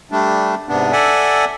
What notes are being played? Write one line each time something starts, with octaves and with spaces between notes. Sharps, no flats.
G3 A3 D4
G#2 C3 B3 D4
A4 D5 E5 F#5 G#5